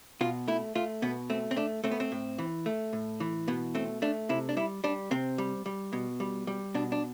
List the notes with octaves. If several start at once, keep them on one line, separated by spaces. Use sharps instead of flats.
B2 F4
A3 E4
A3 F4
B2 B3
A3 C4
C4
A3 D4
A3 C4
B3
C4
A2
E3
A3
A2
E3
B2 B3
A3 C4
A3 D4
C3 E4
D4
G3 E4
G3 D4
C3 C4
G3
G3
B2
G3
G3
B2 D4
D4